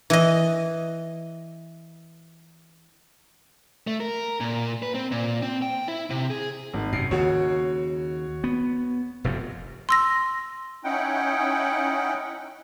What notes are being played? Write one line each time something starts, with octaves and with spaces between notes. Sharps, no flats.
E3 D#5
A3
A#4
A#2
B4
C4
A#2
C4
G5
E4
C3
G#4
G#1
F#2 C3 C7
D#2 C#3 F#4 C#5
B3
F1 F#2 C3
C6 E6 A#6
C#4 D#4 E4 F#5 G5